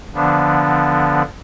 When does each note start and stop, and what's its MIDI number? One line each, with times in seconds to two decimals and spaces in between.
0.15 1.22 50
0.15 1.22 53
0.15 1.22 59
0.15 1.22 62